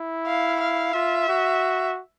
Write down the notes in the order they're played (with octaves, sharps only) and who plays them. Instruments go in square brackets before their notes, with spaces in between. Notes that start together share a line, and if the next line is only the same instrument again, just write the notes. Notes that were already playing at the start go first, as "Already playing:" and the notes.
Already playing: [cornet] E4
[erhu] F5
F5
[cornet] F4 [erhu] E5
[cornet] F#4